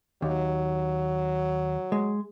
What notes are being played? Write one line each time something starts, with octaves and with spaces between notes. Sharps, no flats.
D#2 F#3
G#3